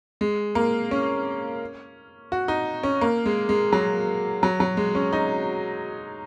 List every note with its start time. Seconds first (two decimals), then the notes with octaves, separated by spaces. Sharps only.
0.21 G#3
0.55 A#3
0.91 C#4
2.32 F#4
2.48 D#4
2.83 C#4
3.01 A#3
3.26 G#3
3.49 G#3
3.73 F#3
4.43 F#3
4.60 F#3
4.77 G#3
4.95 C#4
5.13 D#4